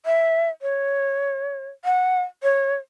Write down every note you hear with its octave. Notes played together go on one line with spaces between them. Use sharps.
E5
C#5
F#5
C#5